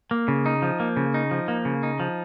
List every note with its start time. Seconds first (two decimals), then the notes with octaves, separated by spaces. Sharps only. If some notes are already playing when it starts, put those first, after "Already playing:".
0.11 A#3
0.28 C#3
0.46 D#4
0.62 F3
0.80 A#3
0.97 C#3
1.14 D#4
1.31 F3
1.48 A#3
1.65 C#3
1.83 D#4
2.00 F3